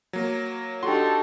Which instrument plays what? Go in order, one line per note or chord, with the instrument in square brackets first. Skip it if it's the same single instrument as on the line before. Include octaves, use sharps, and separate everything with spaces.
[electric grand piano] F#3 A#3
[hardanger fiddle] D4 D#4 [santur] F#4 G4 [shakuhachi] A4 [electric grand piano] C6